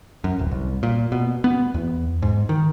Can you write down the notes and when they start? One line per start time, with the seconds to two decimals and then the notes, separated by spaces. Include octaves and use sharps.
0.24 F#2
0.39 D1
0.51 C2
0.83 A#2
1.12 B2
1.44 B3
1.74 E2
2.22 G#2
2.49 D#3